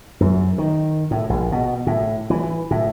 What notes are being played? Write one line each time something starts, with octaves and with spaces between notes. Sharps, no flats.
F#2
D#3
A2
A#1
B2
A2
E3
A2